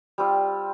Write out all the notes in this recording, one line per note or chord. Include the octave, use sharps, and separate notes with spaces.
G3 C4 F4